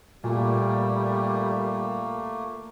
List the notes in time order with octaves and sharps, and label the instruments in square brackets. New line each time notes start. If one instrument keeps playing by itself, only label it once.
[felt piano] A#2 [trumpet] G3 [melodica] A3 A#3